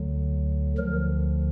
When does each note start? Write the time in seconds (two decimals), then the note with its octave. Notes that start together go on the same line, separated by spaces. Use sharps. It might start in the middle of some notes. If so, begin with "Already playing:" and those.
Already playing: D2 D3 F#3
0.78 D2 D3 F3 A#4